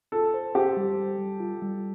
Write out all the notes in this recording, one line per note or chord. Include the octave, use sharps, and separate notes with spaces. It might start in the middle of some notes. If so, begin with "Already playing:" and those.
F4 A4
C5
G4 C5
G3
G3
G3
F4
G3